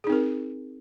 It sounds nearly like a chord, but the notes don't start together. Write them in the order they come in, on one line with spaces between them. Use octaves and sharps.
G#4 D#4 C4 A#4